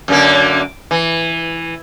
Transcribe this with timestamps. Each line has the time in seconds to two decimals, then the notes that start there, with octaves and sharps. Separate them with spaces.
0.08 F#2 D3 A#3
0.91 E3